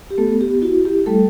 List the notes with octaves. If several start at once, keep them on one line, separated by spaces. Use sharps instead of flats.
G4
A3 B3 A4
G4
E4 F#4
G4
G3 A3 A4